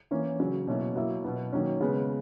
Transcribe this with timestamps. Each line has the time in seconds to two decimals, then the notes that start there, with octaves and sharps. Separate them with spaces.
0.11 E3 A#3 C#4
0.39 C#3 F#3 C#4
0.67 B2 F#3 A#3 C#4 E4
0.96 F#3 A#3 E4
1.24 B2 F#3 B3
1.52 D#3 F#3 A#3 C#4
1.81 C#3 G#3 B3